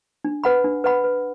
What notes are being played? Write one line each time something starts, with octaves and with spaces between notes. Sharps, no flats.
D4
B4 F#5 B5
D4
B4 F#5 B5
B4